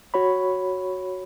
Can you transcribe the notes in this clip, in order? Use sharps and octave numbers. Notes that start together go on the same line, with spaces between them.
F#4 C#5 B5